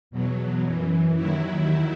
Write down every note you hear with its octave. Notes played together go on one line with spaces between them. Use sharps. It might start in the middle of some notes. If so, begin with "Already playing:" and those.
E2 B2 F#3
F#2 E3
D#2 D#3 F#3 E4